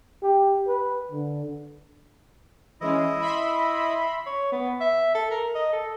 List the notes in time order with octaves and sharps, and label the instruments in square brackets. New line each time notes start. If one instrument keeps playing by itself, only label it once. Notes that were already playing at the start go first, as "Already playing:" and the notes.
[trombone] G4
B4
D3
[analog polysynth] E3 G#3 C#4 [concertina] E4 D#5
[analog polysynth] E5 B5 C6
[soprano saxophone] C#5
B3
E5
A4
A#4
D#5
A4